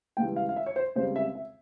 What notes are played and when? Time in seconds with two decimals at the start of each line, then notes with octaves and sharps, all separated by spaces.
0.17 C#2 C#3 E3 G3 G5
0.36 F5
0.49 F5
0.56 E5
0.66 C#5
0.76 C5
0.96 C#2 C#3 G3 C4 C5
1.16 E5
1.35 E5